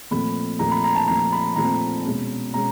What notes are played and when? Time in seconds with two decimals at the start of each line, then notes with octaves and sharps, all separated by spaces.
0.11 A#2 F3 A3 C4 B5
0.59 A#2 F3 A3 C4 A#5
0.71 B5
0.84 A#5
0.96 A5
1.08 A#2 F3 A3 C4 A#5
1.32 B5
1.56 A#2 F3 A3 C4 A#5
2.05 B2 G#3 C#4
2.53 B2 G#3 C#4 A#5